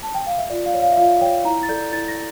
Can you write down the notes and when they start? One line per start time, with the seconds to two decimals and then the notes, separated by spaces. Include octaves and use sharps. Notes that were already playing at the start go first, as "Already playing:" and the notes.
0.03 A5
0.14 G5
0.27 F5
0.39 E5
0.50 F4 D5
0.66 F5
0.74 C#5
0.82 F5
0.92 E5
0.97 F4 F5
1.21 C#5 G5
1.45 E4 A#5
1.63 A6
1.69 A4 D5 G6
1.93 E4 A6
2.08 A#6